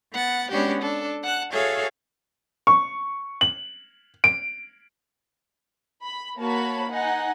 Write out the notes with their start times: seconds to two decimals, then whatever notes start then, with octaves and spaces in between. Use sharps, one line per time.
0.13 B3 F#5 A6
0.51 G#3 B3 C#4 D4 F#4 G4
0.82 D4 A4
1.23 F#5 A5 F#6
1.51 F#4 G#4 A4 C#5 E5 F5
2.67 C#6
3.41 F#7
4.24 D7
6.04 B5
6.38 A#3 F#4 C#5 A5 B5
6.90 D#4 F#5 G#5